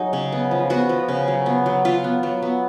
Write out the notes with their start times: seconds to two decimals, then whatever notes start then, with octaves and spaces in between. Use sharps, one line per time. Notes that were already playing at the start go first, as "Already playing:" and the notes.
Already playing: F#3 D#4 G#4
0.13 C#3
0.32 B3
0.51 F3
0.70 B3 F#4
0.89 F3
1.08 C#3
1.28 F#3
1.46 B3
1.66 F#3
1.85 F#3 F4
2.04 B3
2.23 F#3
2.42 B3